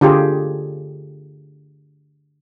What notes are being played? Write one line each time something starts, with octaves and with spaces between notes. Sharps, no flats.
D3 F4 G4 G#4